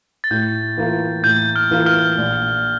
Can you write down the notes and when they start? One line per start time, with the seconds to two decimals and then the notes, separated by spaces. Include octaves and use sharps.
0.24 A6
0.31 A2 G6
0.78 E3 A#3 F4
1.24 A2 G6
1.56 F6
1.71 E3 A#3 F4
1.86 F6
2.18 A#1